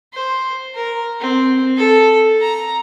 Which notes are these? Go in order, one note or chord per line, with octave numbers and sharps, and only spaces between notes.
C5
A#4
C4
A4
A#5